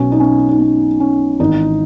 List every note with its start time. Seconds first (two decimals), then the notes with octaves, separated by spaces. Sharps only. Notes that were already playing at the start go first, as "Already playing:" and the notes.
Already playing: B1 B2 C#4
0.12 D#4
0.20 C#4
0.49 D#4
0.59 C#4
1.00 C#4
1.40 G#1 G#2 E3 D#4